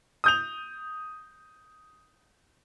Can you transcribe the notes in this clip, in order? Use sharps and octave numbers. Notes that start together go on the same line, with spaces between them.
D#6 G6 F7